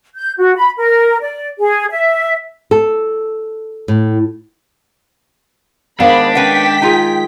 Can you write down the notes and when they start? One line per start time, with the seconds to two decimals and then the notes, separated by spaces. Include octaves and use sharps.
0.15 G6
0.38 F#4
0.57 B5
0.77 A#4
1.21 D5
1.58 G#4
1.91 E5
2.71 A4
3.88 A2
6.00 D#3 G#3 B3 D4 C5 F5 B5
6.35 C#4 B4 F#5 G5 B6
6.82 D#4 F4 G#4